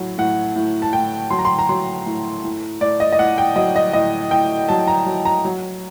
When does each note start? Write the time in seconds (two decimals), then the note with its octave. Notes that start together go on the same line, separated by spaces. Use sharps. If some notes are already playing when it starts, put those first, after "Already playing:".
Already playing: A2 F#3
0.18 A2 F#5
0.56 A2
0.82 A5
0.93 A2 G5
1.30 F#3 C6
1.39 A#5
1.45 C6
1.59 A#5
1.69 F#3 C6
2.06 A2
2.44 A2
2.81 A2 D5
3.00 D#5
3.12 D#5
3.19 A2 F#5
3.38 G5
3.56 F#3 D#5
3.76 D#5
3.93 A2 D#5
4.31 A2 G5
4.68 F#3 A5
4.87 A#5
5.06 F#3
5.25 A#5
5.45 F#3